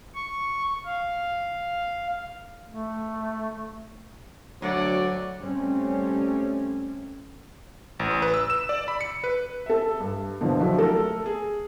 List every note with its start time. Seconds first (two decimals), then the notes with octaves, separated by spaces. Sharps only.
0.15 C#6
0.86 F5
2.69 A3
4.62 D2 F#3 C#5 D5 F#5 D6
5.41 G3 A3 C4 C#4
7.99 A1
8.22 B4
8.34 E6
8.50 E7
8.69 D5
8.88 B5
9.01 C#7
9.24 B4
9.66 A4 E5
10.00 G2
10.40 B2 D3 E3 F3 A#3
10.60 F3 F#3 D4 E4 F#4
10.78 A3 A4 A#4
11.26 G#4